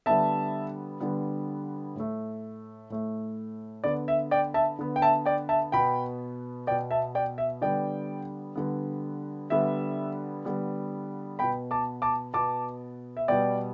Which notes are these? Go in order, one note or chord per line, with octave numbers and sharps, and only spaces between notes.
D3 G3 B3 E5 A5
D3 G3 B3
A2 A3
A2 A3
D3 B3 D5
E5
D5 G5
E5 A5
D3 B3
G5
E5 A5
D5 G5
E5 A5
B2 B3 G5 B5
B2 B3 D5 G5
E5 A5
D5 G5
E5
D3 G3 B3 D5 G5
D3 G3 B3
D3 G3 B3 E5
D3 G3 B3
B2 B3 G5 B5
A5 D6
A5 D6
B2 B3 A5 D6
E5
B2 G3 B3 D5 G5